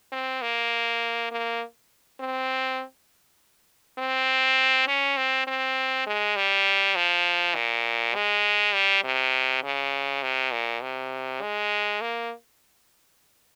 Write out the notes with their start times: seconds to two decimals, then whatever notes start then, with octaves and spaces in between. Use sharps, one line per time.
0.12 C4
0.42 A#3
1.31 A#3
2.20 C4
3.98 C4
4.88 C#4
5.17 C4
5.47 C4
6.07 G#3
6.36 G3
6.96 F3
7.55 A#2
8.15 G#3
8.74 G3
9.04 C3
9.64 C#3
10.23 C3
10.52 A#2
10.82 C3
11.41 G#3
12.01 A#3